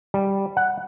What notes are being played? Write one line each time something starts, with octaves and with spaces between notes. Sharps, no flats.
G3
F#5